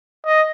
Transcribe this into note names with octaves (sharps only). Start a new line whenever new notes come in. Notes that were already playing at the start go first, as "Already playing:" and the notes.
D#5